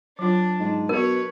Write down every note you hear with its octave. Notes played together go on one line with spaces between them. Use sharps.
F#3 D4 F4
G#2
B2 A#4 B4 C#5